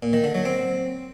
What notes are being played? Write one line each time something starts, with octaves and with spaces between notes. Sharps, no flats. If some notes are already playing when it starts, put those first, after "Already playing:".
A#2
D#3
D3
F#3
C4